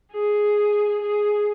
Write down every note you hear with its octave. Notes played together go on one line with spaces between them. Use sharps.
G#4
G#4